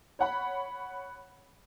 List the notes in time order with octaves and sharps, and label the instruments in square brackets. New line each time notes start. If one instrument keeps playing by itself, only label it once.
[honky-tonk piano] C#5 F#5 B5